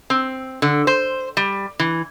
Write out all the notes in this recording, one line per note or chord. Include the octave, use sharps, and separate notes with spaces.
C4
D3
C5
G3
E3